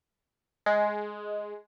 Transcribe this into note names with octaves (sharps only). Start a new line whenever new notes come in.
G#3